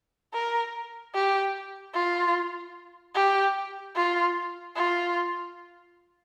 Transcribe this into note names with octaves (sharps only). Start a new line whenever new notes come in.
A#4
G4
F4
G4
F4
F4